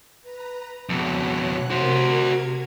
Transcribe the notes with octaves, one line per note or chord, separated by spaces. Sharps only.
B4 A#5
F2 B2 C#5 F#6
C3 F#4 A#4 C5 G#6